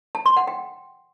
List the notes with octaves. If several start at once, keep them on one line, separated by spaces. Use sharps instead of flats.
A5
C6
F#5
G5